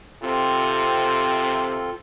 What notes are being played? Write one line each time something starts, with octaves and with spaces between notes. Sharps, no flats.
C3 C4 F4 A4